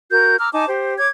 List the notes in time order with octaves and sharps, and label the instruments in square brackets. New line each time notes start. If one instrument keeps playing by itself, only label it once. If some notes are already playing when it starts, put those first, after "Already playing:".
[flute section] F#4 A#4 G6
A#5 D6 E6 F6
D#4 G#5 A5 D6
G4 C5
C#5 D6 G#6